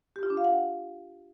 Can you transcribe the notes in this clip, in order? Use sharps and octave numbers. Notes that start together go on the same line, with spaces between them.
G4
F4
D4
F5
F#5